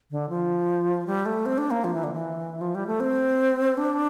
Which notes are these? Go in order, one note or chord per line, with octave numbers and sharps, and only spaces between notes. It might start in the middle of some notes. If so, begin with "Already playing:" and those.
D3
F3
G3
A3
C4
D4
A#3
F3
E3
D3
E3
F3
G3
A3
C4
D4